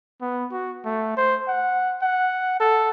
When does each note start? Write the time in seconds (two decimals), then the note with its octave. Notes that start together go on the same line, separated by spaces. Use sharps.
0.21 B3
0.52 F#4
0.85 A3
1.17 C5
1.48 F#5
2.02 F#5
2.60 A4